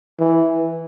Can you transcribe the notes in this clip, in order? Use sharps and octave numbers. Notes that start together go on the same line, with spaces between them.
E3